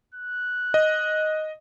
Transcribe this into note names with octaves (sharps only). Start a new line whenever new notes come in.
F#6
D#5